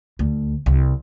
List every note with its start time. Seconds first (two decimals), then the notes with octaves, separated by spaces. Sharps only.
0.19 D2
0.66 C2